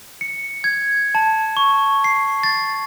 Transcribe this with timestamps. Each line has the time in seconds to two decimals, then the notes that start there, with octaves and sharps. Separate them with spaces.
0.21 C#7
0.64 G#6
1.15 A5
1.57 C#6
2.04 C7
2.43 A6